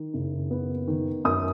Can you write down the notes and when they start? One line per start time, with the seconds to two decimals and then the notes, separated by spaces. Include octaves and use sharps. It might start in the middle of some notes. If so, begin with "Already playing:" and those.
Already playing: D#3
0.14 F#1
0.51 B3
0.87 D#3
1.24 F#2 D#6